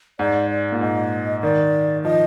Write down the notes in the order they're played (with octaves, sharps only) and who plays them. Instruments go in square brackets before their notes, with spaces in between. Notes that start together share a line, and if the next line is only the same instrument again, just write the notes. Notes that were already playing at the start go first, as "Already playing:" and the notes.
[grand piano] G#2 [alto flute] D5
[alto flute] D5
[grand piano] A#2
[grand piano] G#2 [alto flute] D#5
[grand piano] D#3 [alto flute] D5
[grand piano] F3 [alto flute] D#5